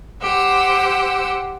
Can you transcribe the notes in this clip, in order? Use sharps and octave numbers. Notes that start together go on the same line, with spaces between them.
G4 C5 F#5 E6